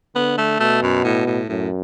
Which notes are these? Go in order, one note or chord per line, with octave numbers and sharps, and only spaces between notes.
D3 B3
A3
B2 A3
F#2
A2
A2
F#2 A2